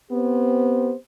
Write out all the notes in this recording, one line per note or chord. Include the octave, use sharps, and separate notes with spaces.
B3 C4 G4 C5